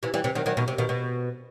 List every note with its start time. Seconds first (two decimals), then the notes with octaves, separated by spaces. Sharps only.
0.03 C3 E3
0.14 E3 G3
0.24 C3 E3
0.35 D#3 F#3
0.46 D#3 F#3
0.57 B2 D#3
0.68 C3
0.78 B2 D#3
0.89 B2